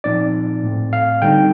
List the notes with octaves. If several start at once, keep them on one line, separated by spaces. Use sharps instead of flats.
A#2 F3 C4 D#4 D5
A2 A3 C4
F5
D3 G3 C4 D#4 G5